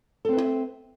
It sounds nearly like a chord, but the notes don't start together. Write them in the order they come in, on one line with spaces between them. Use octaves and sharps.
A4 C4 B4 E4 E5